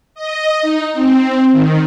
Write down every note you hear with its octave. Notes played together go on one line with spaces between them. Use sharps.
D#5
D#4
C4
D#3